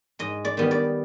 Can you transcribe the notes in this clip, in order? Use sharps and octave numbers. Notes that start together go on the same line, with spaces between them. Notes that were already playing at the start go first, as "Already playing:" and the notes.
G#2 D#5
D5
D#3 G3 B3
D5